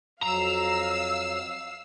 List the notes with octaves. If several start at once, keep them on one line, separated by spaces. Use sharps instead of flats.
F2 F#3 F5 A#5 E6 C7